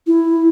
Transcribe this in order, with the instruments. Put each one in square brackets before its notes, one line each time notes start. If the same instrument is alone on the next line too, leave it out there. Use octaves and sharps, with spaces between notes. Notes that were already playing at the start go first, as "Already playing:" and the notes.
[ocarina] E4